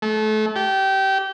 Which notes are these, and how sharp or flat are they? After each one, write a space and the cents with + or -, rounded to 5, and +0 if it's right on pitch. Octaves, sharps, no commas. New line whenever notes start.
A3 -30
G4 -20